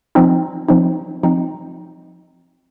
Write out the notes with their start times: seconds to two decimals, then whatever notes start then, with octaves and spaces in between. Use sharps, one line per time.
0.15 F3 C4 D#4
0.69 F3 C4 D#4
1.23 F3 C4 D#4